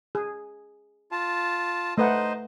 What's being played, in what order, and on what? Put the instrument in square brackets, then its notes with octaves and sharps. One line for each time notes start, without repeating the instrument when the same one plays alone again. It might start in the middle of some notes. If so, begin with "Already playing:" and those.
[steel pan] G#4
[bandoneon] F4 A5
[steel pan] A3 B4 F#5 [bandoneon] D#4 C5 D#5